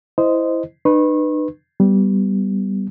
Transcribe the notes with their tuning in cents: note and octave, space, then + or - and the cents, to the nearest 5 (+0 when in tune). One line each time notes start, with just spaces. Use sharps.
E4 +0 C5 -15 D#5 +0
D#4 -45 B4 +0 C#6 -35
G3 -10 B3 +0